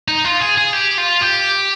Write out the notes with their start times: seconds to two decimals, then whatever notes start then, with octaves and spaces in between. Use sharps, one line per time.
0.08 D#4
0.24 F4
0.40 G#4
0.57 G#4
0.73 G4
0.97 F4
1.21 G4